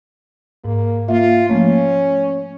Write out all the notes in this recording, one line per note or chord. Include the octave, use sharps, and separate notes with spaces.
G#2 A#3
A#3 F4 E5
F3 A3 A#3 C#4